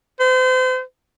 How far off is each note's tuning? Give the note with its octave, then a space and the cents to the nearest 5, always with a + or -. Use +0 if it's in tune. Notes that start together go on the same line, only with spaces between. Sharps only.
C5 -35